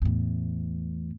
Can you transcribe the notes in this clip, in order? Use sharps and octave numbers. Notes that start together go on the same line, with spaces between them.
E2 A2